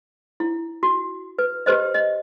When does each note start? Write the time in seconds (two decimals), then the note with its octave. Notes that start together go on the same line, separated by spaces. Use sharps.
0.40 E4
0.83 F#4
1.38 B4
1.66 G4 B4 C5 D#5
1.94 D#5